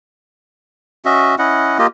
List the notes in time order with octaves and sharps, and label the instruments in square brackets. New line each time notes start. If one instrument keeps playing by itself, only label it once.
[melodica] C#4 F#4 D#5 E5
C#4 E4 D#5 F#5
A#3 F4 G4 D#5